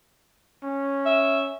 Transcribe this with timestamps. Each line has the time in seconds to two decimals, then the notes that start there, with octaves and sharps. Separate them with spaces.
0.64 C#4
1.06 E5